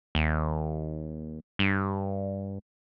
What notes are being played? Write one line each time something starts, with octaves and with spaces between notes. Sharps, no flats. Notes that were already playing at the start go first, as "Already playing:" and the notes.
D#2
G2